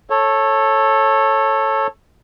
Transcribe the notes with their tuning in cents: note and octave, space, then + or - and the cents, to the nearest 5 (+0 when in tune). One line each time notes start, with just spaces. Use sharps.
A4 +0 C#5 -15